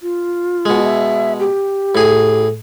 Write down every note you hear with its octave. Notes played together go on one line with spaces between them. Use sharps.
F4
B2 G#3
E5
G4
A2 G#4